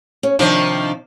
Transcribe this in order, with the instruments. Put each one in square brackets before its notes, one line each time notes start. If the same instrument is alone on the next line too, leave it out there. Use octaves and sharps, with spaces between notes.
[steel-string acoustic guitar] C#4
[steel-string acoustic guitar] C3 D#4 D5 [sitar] D#3 F3 D4